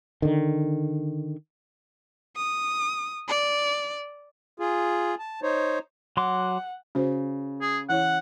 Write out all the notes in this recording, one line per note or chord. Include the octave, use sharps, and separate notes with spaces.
D3 D#3
D#6
D5
F4 G#4
A5
D#4 C5 C#5
F#3 F#5 C6 D6
C#3 F#4 C5
G#4
E3 E4 C#5 F#5